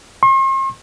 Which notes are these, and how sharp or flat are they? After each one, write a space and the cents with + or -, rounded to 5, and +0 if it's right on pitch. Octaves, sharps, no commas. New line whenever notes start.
C6 +45